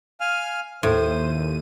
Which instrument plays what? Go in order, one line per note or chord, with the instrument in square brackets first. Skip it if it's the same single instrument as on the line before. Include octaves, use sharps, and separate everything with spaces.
[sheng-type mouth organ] F5 G#5 F6
[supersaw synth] D#2 D#7 [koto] A2 [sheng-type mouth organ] C5